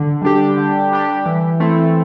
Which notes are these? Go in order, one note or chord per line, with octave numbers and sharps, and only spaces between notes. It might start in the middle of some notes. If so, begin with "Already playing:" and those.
Already playing: D3
G3 D4 G4
D3
G3 D4 G4
E3
A3 C4 E4